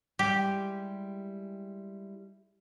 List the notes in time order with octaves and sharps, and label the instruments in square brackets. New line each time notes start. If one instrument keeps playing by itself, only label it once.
[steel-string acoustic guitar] G3 G#3 E4 [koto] G4